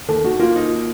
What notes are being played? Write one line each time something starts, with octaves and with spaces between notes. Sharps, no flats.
D#2 A4
D#3 F#4
A#3 F4
D#4